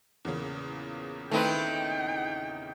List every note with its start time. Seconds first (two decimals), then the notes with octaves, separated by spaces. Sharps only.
0.25 E2 A#2 C#3
1.31 D#3 A3 C4 D#4 E4 B4 G5